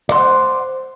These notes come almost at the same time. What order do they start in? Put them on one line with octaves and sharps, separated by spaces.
D5 C6 F#5 C5